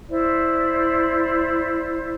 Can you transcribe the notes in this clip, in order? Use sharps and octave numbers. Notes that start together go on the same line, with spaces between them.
E4 C5 D5 E5